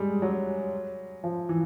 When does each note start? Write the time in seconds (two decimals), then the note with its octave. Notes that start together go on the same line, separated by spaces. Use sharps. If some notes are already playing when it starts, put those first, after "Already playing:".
Already playing: G3 G#3
0.22 F#3
1.24 F3
1.49 E3